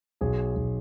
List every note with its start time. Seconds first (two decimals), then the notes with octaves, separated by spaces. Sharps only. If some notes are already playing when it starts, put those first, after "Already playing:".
0.21 B1 G#4
0.55 B1